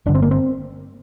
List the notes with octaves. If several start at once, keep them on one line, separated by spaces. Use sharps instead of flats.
G1 G2 D3 D4
C4
A#3
C4